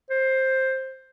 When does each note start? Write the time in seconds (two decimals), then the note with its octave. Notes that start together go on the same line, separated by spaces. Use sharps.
0.10 C5